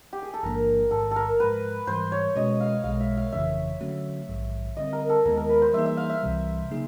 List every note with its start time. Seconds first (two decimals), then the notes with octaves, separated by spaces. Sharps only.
0.13 G4
0.23 G#4
0.34 A4
0.43 A1 G#2 F3 A#3 D4 A#4
0.91 A1 G#2 D#3 A4
1.11 A4 A#4
1.39 G#2 F3 G#3 B4
1.87 G#2 E3 G3 C5
2.12 C#5
2.36 B2 G#3 C#4 F#4 B4 D#5
2.61 F5
2.84 B1 B2 G#3 F5
3.00 E5
3.17 F5
3.33 G1 F2 C#3 E3 E5
3.81 D3 F#3 A3 C#4 F#4
4.29 A#1 G#2 D#3 F#3
4.77 D3 G3 C4 D#5
4.93 A#4
5.09 A4
5.25 D#2 D#3 G#3 B3 E4 A#4
5.37 A#4
5.49 B4
5.62 C5
5.74 E3 G3 A#3 D#4 G#4 E5
5.86 E5
5.97 F5
6.10 E5
6.22 C2 C3 E3 G3
6.70 C#3 F#3 A#3 D#4 G#4